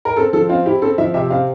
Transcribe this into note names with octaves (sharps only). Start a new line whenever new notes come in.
A#4
C4 A4
F3 A4
C4 F4
E4 G4
C4 A4
F3 E5
C3 E5
C4 F5